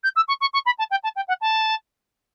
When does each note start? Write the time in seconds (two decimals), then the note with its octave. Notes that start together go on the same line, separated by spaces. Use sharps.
0.03 G6
0.16 E6
0.28 C#6
0.41 C#6
0.53 C#6
0.66 B5
0.78 A5
0.90 G5
1.03 A5
1.16 G5
1.28 F#5
1.41 A5